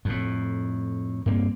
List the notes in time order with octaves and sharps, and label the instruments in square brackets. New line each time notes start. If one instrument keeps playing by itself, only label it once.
[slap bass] F2 A2
G2 A#3 C4